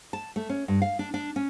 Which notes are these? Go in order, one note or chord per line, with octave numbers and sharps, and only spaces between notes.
A5
A3
C#4
G2
F5
D4
D4
C#4